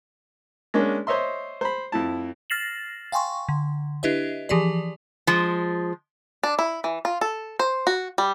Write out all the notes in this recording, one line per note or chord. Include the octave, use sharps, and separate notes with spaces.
G#3 A#3 C#4 D4
C5 C#5 D#5 E5 C6
C5 B5
F2 E4 A5
F6 A6 A#6 C7 E7 F#7
F5 G5 G#5 C6 C#6
D3
D4 E4 G4 B4 D#5 E5
E3 F3 G4 G#4 D5
F3 G#3
D4
E4
E3
F4
A4
C5
F#4
G3